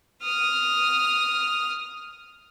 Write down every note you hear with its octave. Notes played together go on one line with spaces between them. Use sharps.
D#6 F6